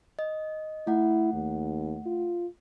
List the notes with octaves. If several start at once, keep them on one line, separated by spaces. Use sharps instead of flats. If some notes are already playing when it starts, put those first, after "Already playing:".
D#5
A3 E4 F#5
D#2
F4